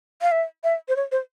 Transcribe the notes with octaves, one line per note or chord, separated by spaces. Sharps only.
F5
E5
E5
C5
C#5
C5